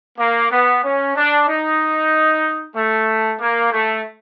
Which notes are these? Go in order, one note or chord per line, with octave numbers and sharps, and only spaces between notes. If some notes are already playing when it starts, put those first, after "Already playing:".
A#3
B3
C#4
D4
D#4
A3
A#3
A3